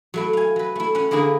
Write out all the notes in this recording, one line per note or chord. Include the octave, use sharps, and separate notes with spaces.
F#3 A3 E4
F5 G#5
F#3 B4
A3 E4
C#4 F#5
D3 A#3 E4 G#4 A#4 B4